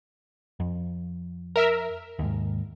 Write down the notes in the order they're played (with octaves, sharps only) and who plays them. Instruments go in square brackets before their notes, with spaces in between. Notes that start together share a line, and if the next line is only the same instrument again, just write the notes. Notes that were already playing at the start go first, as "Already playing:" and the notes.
[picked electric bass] F2
[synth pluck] A#4 E5
[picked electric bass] D#2 G#2